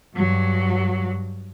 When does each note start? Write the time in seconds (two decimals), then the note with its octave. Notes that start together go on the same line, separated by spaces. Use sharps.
0.16 G2 F#3